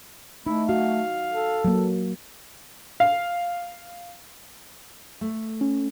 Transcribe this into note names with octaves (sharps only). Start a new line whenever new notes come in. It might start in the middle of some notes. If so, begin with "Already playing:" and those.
A3 D#4 E4
F#4 F5
A4
F#3 A#3
F5
A3
C#4